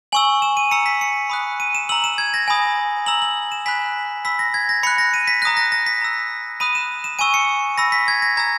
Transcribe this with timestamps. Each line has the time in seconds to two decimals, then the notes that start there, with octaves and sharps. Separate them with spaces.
0.12 G#5 C#6 E6 F#7
0.42 E7
0.57 D#7
0.71 A#5 E6 C#7
0.86 B6
1.01 C#7
1.30 B5 D#6 F#6
1.60 D#7
1.75 E7
1.89 A#5 E6 F#7
2.04 E7
2.18 G#6
2.34 A#6
2.48 G#5 B5 D#6
3.06 A#5 E6 F#7
3.22 F#7
3.52 E7
3.66 G#5 B5 F#6 B6
4.25 B5 E6 B6
4.39 A#6
4.54 G#6
4.69 A#6
4.83 B5 C#7
4.87 F#6
4.98 A#6
5.14 D#7
5.28 B6
5.42 F#6 A#6
5.45 A#5 D#6
5.57 A#6
5.72 A#6
5.86 B6
6.02 A#5 E6
6.60 B5 D#6 F#6 D#7
6.75 E7
7.04 E7
7.19 G#5 C#6 E6 D#7
7.34 C#7
7.78 B5 E6 A#6
7.92 B6
8.08 G#6
8.22 A#6
8.37 A#5 E6 G#6